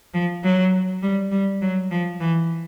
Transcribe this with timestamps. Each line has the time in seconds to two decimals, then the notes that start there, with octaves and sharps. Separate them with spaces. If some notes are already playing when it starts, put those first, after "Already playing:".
0.14 F3
0.43 F#3
1.02 G3
1.31 G3
1.61 F#3
1.91 F3
2.20 E3